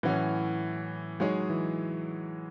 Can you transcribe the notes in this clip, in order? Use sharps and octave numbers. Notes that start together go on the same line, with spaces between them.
A2 E3 F#3 C#4 F#4
F#3 G#3 D#4 G#4 C#5
E3